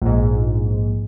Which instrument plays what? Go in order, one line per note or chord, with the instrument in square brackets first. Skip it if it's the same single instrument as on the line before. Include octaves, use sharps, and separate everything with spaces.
[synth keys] A#1 G#2